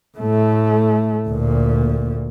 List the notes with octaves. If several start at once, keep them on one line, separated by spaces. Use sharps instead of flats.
A2 A3
D2 A#2